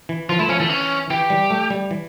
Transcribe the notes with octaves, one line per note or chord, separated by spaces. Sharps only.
E3
F3 F4
A3 E4
F3 C#4
E3 A3
C#4
E3 G4
G3
A3
G3
E3